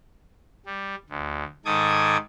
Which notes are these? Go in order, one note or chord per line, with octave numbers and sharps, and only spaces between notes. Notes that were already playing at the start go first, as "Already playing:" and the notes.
G3
D2
G#2 D#3 A4 D6 D#6 G#6